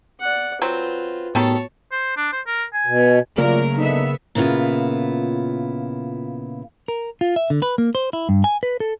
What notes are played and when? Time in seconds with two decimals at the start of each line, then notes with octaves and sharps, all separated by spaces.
0.21 D5 F#5
0.62 F#3 C4 F4 B4
1.35 A2 D#3 G3 B3 F#4 A4 C#5 A5
1.92 C5
2.17 D4
2.33 C5
2.47 A#4
2.74 G#5
2.87 B2
3.38 C#3 F#3 A3 A#3 F4 A#4 D5
3.77 D3 B3 D#4 E5
4.35 A#2 C#3 B3 E4 F4
6.88 A#4
7.21 F4
7.36 E5
7.50 D3
7.62 B4
7.78 A#3
7.95 C5
8.13 E4
8.29 G2
8.44 G#5
8.63 B4
8.80 A4